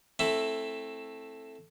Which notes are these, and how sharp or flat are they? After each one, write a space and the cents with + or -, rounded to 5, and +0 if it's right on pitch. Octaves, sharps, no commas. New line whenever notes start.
A3 +0 C4 +20 E4 +0